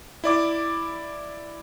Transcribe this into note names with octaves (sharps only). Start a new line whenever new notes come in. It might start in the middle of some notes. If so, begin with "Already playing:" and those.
E4 D5 D6